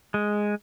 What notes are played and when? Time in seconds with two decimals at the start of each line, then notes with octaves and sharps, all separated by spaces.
0.14 G#3